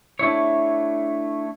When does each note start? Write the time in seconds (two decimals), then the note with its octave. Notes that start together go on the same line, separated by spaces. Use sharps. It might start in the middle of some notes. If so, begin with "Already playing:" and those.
0.19 A3 D4 E4 C#5